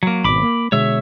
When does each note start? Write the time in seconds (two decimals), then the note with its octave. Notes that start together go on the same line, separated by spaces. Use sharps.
0.03 F#3 A#3
0.24 G#1 B2 B5 D6
0.43 A#3
0.72 B2 D3 G#3 C#5 E5